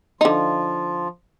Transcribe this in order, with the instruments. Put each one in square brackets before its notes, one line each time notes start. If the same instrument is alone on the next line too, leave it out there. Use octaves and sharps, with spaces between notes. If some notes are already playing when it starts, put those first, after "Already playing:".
[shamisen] D3 D#4 [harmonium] F3 F4